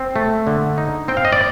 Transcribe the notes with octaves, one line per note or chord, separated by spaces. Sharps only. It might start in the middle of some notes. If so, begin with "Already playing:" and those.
Already playing: C4
A3
D3
D#4
C4 G5
F5
D#5
D5